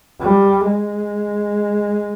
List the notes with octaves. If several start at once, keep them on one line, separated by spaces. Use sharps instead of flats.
G3
G#3